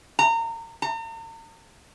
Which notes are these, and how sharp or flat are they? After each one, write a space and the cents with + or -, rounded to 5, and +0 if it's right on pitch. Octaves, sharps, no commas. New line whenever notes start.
A#5 -30
A#5 -45